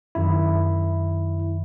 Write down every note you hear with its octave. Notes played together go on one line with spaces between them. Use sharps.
F#2 D#3 E4